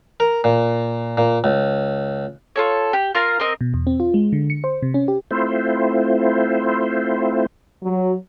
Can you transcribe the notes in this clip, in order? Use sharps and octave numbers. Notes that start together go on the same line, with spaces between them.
A#4
A#2
A#2
C#2
F4 A4 C#5
G4
F4 A#4 F5 A#5
C4 A#4 D#5
B2
E2
C4
F4
G#3
D3
C#7
C5
C3
C#4
G4
A3 C4 E4 F4 C5
F#3